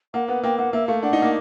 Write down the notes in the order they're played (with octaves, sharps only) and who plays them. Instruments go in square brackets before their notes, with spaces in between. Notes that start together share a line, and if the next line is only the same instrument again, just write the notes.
[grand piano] A#3 [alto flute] F#5
[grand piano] B3 [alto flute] F#5
[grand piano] A#3 [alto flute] G5
[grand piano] A#3 [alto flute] F#5
[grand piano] A#3 [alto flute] E5
[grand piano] A3 [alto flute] F5
[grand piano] D4 [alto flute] F#5
[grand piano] D#4
A#3